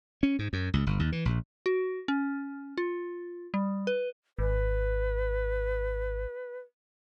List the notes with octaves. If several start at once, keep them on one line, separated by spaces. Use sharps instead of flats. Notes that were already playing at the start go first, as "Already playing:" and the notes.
C#4
G#2
F#2
C#2
G1
D#2
E3
A#1
F#4
C#4
F4
G3
B4
G#1 B4